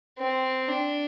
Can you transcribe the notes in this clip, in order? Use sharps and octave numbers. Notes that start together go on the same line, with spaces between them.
C4
D4